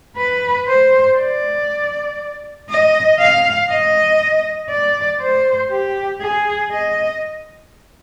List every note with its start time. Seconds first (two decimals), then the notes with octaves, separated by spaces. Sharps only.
0.17 B4
0.67 C5
1.18 D5
2.69 D#5
3.19 F5
3.69 D#5
4.70 D5
5.21 C5
5.71 G4
6.21 G#4
6.71 D#5